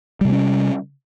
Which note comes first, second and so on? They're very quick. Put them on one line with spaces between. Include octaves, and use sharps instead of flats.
G3 C3 A#3 C#4